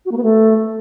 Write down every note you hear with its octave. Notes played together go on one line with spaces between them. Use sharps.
F#4
A#3
B3
A3